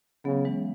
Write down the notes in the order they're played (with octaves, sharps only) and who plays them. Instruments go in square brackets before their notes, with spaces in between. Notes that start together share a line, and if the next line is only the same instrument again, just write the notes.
[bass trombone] C#3 [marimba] F#3 B3
[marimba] E3 G#3